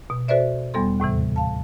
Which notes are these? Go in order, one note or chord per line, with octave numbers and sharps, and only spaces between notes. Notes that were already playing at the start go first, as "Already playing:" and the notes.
B2
F#4 A4 B4 C5 D5 E5
E2 G3 B3 A4 C6
D#2 A2 C3 E3
F5 A5